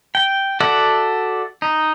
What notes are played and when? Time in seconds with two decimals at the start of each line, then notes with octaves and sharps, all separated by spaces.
0.15 G5
0.60 F#4 A4 D5 E5 F#5
1.62 D#4